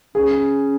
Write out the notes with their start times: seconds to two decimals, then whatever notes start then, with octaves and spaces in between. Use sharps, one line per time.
0.15 C#4 G#4